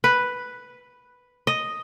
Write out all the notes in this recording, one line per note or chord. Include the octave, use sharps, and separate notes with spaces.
B4
D#5